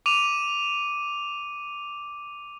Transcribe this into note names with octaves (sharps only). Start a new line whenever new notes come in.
D6 D#7 F7